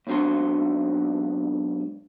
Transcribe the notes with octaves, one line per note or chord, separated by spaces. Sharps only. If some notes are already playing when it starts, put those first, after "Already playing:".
B1 G#2 C4 D4 F#4 C6